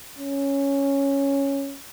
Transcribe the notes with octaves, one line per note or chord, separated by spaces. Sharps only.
C#4